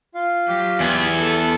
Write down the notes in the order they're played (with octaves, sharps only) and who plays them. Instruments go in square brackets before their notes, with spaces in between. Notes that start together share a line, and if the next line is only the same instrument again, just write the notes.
[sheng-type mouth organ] F4 F5
[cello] F#3 G4
[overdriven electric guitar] E2 B3 [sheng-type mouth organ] E5 G#5
[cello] A4